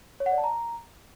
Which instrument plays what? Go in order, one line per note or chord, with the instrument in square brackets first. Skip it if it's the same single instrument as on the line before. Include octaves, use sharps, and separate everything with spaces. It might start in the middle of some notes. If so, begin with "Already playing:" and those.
[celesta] C#5
F#5
D5
A5
A#5